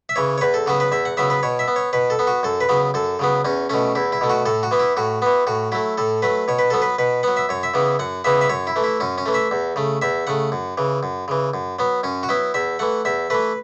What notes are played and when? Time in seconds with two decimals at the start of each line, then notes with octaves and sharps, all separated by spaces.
0.09 E5
0.16 C#3 E3 C#5
0.38 C#5
0.41 E2 B4
0.54 A4
0.66 C#3 F#3 B3 F#4
0.80 B4
0.92 E2 E5
1.05 F#5
1.17 C#3 F#3 B3 E5
1.30 B4
1.43 B2 C#5
1.59 E5
1.68 B3
1.76 C#5
1.93 B2 B4
2.10 A4
2.19 B3
2.27 F#4
2.43 F#2 A4
2.61 B4
2.69 C#3 F#3 B3
2.94 F#2 A4
3.19 C#3 F#3 B3
3.45 E2 C#4
3.69 B2 A3 C#4
3.95 E2 E4
4.12 E4
4.21 B2 A3
4.30 F#4
4.46 A2 A4
4.63 F#4
4.71 E3 B3
4.79 E4
4.97 A2 F#4
5.22 E3 B3
5.47 A2 F#4
5.72 F#3 A3 E4
5.98 A2 A4
6.22 F#3 A3 B4
6.48 B2 C#5
6.59 B4
6.70 F#3 B3 A4
6.82 B4
6.99 B2 B4
7.23 F#3 B3 F#5
7.37 E5
7.49 F#2 C#5
7.63 E5
7.74 C#3 E3 B3
7.99 F#2 F#5
8.24 C#3 E3 B3 E5
8.41 E5
8.50 F#2 C#5
8.67 E4
8.76 E3 A3
8.84 E4
9.00 F#2 C#4
9.18 C#4
9.26 E3 A3
9.34 E5
9.51 E2
9.76 C#3 A3
10.02 E2 E5
10.27 C#3 A3 F#5
10.52 F#2
10.78 C#3 E3
11.03 F#2
11.28 C#3 E3
11.54 F#2
11.79 F#3 B3
12.03 F#2 C#4
12.23 F#4
12.29 F#3 B3 E4
12.54 E2 E5
12.79 E3 A3 F#5
13.05 E2 E5
13.30 E3 A3 B4